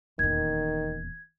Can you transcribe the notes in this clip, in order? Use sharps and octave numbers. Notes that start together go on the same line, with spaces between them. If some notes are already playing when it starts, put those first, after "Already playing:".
D#1 E2 D#3 G#6